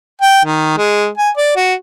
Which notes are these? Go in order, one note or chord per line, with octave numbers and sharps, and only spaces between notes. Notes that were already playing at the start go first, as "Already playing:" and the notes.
G5
D#3
G#3
G#5
D5
F#4